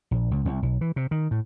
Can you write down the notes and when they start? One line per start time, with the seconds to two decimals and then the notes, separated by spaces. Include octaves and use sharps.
0.11 A#1
0.31 C#2
0.45 C2
0.62 B1
0.81 E3
0.96 C3
1.11 D#3
1.31 A2